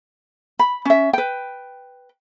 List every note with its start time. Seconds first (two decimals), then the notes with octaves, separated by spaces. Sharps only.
0.59 B5
0.85 C#4 E5
1.13 B4 G5